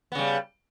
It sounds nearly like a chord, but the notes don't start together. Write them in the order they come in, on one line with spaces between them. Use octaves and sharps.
B3 C#3 G3